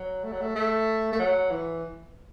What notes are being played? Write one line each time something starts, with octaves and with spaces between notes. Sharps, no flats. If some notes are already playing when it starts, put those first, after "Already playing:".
Already playing: F#3
A3
F#3
A3
A3
A3
F#3
E3